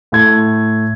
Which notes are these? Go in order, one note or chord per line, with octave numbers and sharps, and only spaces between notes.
A2 A3 A4 G#6